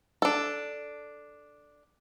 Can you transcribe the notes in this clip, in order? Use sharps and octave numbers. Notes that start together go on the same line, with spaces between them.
D4 A4